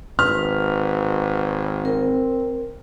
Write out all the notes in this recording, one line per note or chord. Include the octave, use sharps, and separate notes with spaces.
G#1 B4 F6
C4 A#4